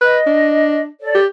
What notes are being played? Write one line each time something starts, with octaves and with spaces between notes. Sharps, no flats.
B4 D#5
D4
A4 C#5 D5
G4